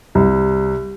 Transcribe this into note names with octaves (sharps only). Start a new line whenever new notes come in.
C2